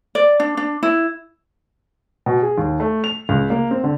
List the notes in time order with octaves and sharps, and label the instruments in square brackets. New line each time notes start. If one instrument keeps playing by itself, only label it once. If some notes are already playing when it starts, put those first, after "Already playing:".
[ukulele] D5
D4
D4
E4
[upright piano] B2
G#4
D#2
A3
F7
C#2
A#3
C4
D3